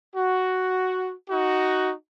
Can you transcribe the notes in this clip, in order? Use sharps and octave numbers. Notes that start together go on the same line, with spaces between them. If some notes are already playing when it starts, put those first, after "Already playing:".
F#4
D#4 F#4